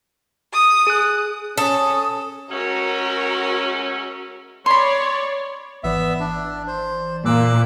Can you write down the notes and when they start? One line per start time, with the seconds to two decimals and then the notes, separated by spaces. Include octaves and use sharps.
0.53 D#6
0.87 G#4 F#6
1.58 C#4 A4 D#6
2.51 G#3 A3 C#4 F#4 A#4
4.66 C#5 D5 B5 C6
5.84 G#1 E3 B3 D5 E5
6.20 D4
6.67 C5
7.25 A#2 D6 E6 F#6